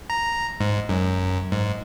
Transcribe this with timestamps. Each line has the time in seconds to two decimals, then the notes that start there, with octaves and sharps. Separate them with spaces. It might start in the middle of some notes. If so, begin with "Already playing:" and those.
0.10 A#5
0.61 G#2
0.89 F#2
1.52 G#2